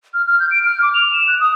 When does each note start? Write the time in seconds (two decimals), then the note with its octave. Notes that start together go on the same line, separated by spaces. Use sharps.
0.14 F6
0.27 F6
0.40 G6
0.51 D7
0.65 F6
0.82 D6
0.94 F7
1.13 E7
1.28 F#6
1.40 D#6